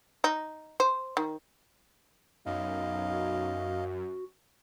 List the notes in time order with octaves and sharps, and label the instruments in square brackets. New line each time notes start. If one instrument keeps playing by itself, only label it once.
[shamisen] D#4
C5
D#3
[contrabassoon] B1 [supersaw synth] F#2 [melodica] D#5 F5
[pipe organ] F#4